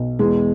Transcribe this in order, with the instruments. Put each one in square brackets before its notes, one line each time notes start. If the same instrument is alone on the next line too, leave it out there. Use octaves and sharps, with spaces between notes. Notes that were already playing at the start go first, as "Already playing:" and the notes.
Already playing: [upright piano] B1
E2 G#3